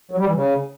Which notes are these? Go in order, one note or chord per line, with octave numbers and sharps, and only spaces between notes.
F#3
G3
E3
C#3